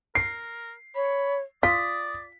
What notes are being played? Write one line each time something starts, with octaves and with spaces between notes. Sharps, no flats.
A#4 C7
C#5 B5
F4 D5 D#6 B6